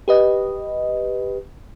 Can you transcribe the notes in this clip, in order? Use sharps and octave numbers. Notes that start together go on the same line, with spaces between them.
G4 B4 D#5